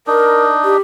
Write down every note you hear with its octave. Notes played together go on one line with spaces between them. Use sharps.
D4 D#4 A#4
G4